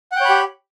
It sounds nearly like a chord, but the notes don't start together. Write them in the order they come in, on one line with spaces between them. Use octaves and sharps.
F#5 G5 C#5 B5 G4